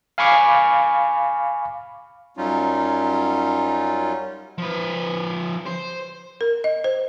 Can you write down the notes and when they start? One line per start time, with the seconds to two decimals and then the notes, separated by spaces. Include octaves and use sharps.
0.18 F5 G#5 B5 C#6 D6 F6
2.37 F#2 F#3 G3 C#4 D#4 F4
4.58 F3 B4
5.66 C5
6.41 A#4
6.64 D#5
6.84 C5